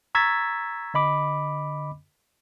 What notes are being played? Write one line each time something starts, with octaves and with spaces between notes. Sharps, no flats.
A#5 C#6 E6 G#6 A6 B6
D3 D#5 B5 D6